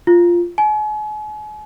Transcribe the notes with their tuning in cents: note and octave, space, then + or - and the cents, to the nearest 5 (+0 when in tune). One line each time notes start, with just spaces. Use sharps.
F4 -5
G#5 +40